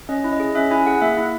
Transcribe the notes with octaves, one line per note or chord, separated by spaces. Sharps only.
C#4 D#5
E4
D#5
G#4
C#4 E5
E4 G#5
G#4 F#5
A#3 E5
E4